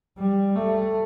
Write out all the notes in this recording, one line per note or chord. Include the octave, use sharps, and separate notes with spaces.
G3
A3